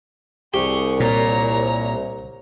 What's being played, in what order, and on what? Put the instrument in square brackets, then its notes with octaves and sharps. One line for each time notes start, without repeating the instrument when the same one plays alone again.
[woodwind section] C2 [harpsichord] G4 [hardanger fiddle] G#4 C#6
[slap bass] A#2 [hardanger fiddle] C#5 A#5